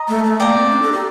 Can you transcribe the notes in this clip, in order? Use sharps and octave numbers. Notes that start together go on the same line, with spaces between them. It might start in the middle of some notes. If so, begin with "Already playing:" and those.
Already playing: D#5 A#5 D#6
A3
A3
A#3 D5 G5 A#5
C4
D4
A4
G4